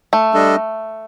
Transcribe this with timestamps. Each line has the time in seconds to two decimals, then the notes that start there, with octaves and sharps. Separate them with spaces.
0.13 A3
0.34 G3 D4 A4 D#5